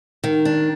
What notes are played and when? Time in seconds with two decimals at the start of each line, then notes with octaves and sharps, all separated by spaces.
0.24 D#3
0.45 D4